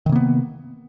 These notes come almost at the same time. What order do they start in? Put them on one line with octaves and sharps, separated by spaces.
D#3 C3 A#3 B3